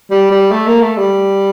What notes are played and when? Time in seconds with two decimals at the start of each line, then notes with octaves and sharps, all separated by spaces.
0.11 G3
0.31 G3
0.51 A3
0.67 A#3
0.82 A3
0.98 G3